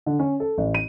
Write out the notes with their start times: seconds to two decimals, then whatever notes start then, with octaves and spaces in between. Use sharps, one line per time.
0.06 D3
0.19 C#4
0.40 A4
0.58 A1
0.74 D#7